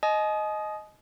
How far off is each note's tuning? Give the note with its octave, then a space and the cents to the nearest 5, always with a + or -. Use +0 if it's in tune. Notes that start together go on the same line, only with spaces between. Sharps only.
D#5 +0 G#5 +45 D#6 +0